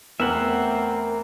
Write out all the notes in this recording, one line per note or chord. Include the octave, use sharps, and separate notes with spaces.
E2 A3 C4 A#4 B4 E5 F#5 F6